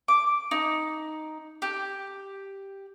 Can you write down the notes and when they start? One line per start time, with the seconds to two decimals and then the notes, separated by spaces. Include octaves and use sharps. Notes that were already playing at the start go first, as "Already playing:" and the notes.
0.08 D6
0.51 D#4
1.62 G4